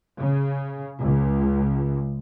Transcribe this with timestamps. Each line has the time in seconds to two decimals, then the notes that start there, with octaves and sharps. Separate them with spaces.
0.20 C#3
1.02 C#2